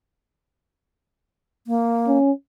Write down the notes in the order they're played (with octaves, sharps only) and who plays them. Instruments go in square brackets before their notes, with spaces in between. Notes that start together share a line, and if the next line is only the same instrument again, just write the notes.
[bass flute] A#3
[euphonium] C#4